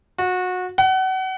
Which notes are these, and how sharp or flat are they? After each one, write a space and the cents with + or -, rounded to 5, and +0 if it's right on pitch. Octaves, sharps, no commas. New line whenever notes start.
F#4 -25
F#5 +30